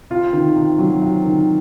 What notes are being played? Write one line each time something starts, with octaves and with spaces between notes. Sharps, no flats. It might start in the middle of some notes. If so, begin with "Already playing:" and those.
C3 F4
D#3
C3
F#3
C3
D#3